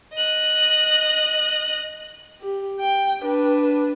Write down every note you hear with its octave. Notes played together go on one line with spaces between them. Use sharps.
D#5 F#6
G4
G5
D4 B4